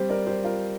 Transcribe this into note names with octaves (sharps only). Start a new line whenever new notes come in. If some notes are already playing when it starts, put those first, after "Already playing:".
Already playing: G3 C4 G4 C5
A#4 D5
G4 C5
F4 A#4